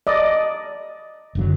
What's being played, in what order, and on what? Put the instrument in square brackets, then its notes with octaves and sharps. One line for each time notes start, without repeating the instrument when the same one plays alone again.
[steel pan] D5 D#5
[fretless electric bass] F#1 D3 F#3